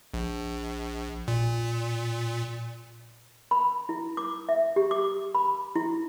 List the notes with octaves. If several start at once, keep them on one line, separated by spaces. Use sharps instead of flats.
A#1
A#2
B5
E4
D6
E5
G4
D6
B5
E4